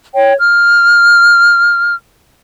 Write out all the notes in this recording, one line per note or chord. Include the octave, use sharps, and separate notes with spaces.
C#5 G5
F6